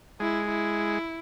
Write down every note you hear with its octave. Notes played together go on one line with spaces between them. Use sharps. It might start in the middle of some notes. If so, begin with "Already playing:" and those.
G#3 E4
E4